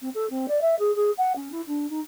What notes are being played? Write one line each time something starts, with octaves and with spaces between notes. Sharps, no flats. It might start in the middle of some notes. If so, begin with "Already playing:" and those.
C4
A4
C4
D5
E5
G#4
G#4
F#5
C#4
E4
D4
D#4